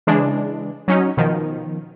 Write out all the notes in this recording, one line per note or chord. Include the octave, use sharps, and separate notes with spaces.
C#3 E3 G#3 D4
F#3 C#4 D#4
B2 D#3 F3